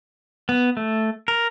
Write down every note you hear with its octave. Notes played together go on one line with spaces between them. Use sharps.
B3
A3
A#4